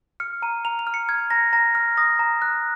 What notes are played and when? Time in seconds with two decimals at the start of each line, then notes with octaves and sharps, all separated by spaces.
0.20 F6 C#7
0.42 A#5 D#7
0.65 A#5 F7
0.79 F7
0.87 F6
0.94 C#7
1.09 F6 G#6
1.30 A#5 A#6
1.53 A#5 A#6
1.75 F6
1.97 D#6 A#6
2.19 A#5
2.42 F#6